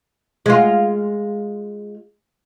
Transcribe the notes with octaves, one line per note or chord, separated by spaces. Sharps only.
G#3 F4